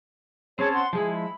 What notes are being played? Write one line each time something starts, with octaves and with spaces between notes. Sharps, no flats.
C4 C#4 G#4 C#5 A5
F#5 C6
F3 G#3 E4 G#4
B5